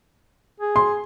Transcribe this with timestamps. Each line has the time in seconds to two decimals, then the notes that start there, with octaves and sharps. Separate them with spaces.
0.60 G#4
0.76 C6